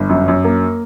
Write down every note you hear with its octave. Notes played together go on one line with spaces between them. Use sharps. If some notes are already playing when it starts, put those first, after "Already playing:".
Already playing: G1
F#2
F#2
A#3